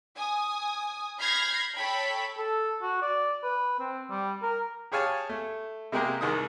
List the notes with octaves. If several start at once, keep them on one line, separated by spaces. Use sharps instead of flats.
G#5 D#6
B5 F6 G6 G#6 A#6 C7
A4 C#5 G5 B5
A4
F#4
D5
B4
C4
G3
A#4
G4 G#4 C#5 F5 G#5 A5
A3
C3 G#3 A#3 G4 G#4 A#4
C2 D#3 G#3 D#6